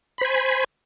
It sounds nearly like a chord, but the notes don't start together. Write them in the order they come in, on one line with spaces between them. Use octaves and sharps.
B5 C5 G#5